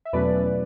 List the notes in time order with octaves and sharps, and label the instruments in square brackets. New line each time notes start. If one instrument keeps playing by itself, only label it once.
[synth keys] E5
E2 B2 F#3 A3 C#4 B4 D5